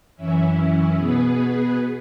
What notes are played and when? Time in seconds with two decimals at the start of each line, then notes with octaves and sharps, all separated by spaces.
0.16 F#2 E3 C#4 E4
0.95 B2 B3 G#4 B4